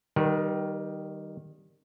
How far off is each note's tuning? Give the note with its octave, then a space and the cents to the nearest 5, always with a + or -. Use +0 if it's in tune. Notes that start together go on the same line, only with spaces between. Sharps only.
D#3 -10 G3 -20 B4 -45